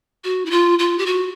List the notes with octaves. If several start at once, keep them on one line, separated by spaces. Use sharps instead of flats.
F#4
E4
F4
F4
G4
F#4